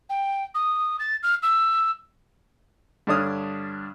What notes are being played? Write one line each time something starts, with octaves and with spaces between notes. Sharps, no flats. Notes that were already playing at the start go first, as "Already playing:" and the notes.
G5
D#6
A6
F6
E6
G2 D3 D4 C#5 D#6 F6